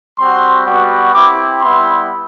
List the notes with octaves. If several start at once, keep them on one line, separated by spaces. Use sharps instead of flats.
G3 C4 F#4 C6
G3 B3 F#4
C4 E4 G4 D6
G3 B3 E4 C6